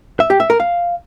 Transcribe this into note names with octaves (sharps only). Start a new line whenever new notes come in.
E5
G4
E5
A#4
F5